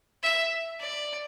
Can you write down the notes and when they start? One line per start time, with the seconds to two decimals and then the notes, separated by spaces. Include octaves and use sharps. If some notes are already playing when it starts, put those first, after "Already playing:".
0.23 E5
0.80 D5